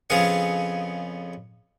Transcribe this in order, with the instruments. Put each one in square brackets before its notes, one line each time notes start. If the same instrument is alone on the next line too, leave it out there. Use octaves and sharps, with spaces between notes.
[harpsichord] F2 C#3 B3 G#4 F5 F#5